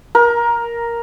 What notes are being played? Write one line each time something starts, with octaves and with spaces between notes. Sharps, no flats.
A#4